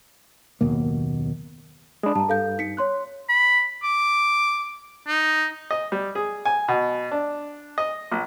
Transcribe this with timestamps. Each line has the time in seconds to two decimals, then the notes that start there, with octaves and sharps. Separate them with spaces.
0.61 F#1 D#2 B2 A#3
2.03 G#3 D4 A5 B5 D#6
2.16 G2 A5 A#5
2.29 A4 F5 G6
2.58 D#4 B6 C#7
2.77 C#5 C6 F#6
3.29 B5
3.84 D6
5.08 D#4
5.71 D#5
5.92 G3
6.15 G#4
6.45 G#5
6.68 B2
7.11 D4
7.78 D#5
8.12 A#1